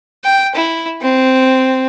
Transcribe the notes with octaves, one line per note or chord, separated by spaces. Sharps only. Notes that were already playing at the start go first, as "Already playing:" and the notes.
G5
E4
C4